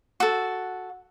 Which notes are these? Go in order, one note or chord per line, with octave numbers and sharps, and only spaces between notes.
F#4 A4